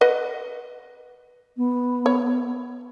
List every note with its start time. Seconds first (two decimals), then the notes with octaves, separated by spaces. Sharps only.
0.01 B4 D#5 F#5
1.56 B3
2.06 C#5